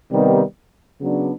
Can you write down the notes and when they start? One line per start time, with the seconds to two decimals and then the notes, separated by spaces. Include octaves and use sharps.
0.11 C3 D#3 G3 B3 D#4
0.99 C#3 F#3 B3 D4